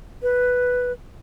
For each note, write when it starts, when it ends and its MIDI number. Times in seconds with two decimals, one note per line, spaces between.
0.22 0.92 71